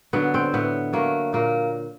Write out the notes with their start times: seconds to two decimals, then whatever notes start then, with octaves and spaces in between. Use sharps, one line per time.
0.13 D3 F#3 B3
0.34 C4
0.54 A2 B3
0.93 F#3 A3 A#3
1.33 A#2 A#3